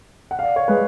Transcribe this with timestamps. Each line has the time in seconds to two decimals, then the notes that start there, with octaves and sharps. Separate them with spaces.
0.31 F#5
0.39 F5
0.43 D5
0.56 C#5
0.68 G#3 B4